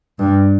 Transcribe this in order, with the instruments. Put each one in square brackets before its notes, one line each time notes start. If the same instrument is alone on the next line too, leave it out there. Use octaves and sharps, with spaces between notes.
[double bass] G2